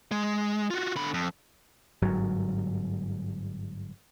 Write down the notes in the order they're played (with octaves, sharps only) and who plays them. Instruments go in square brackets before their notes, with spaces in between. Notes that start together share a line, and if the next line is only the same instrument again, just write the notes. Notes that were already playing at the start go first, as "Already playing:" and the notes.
[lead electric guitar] G#3
F4 F#4
D3 B5
F2
[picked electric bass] G1 G#2 F#3